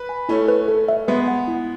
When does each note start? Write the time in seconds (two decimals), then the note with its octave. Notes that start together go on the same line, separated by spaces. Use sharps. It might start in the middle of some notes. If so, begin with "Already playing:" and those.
Already playing: B4
0.09 G#5
0.29 A3 C#4 E4
0.48 B4
0.68 A4
0.88 E5
1.08 G#3 B3 B4
1.28 F#5
1.48 E4